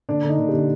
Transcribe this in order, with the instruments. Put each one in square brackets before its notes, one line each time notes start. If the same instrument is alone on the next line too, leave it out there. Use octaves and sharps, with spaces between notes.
[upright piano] D3 D4
D3 D#4
D3
G4
D3